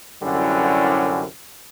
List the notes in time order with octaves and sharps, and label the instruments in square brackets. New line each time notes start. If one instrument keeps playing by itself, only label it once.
[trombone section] C2 F#2 D3 G3 C#4 E4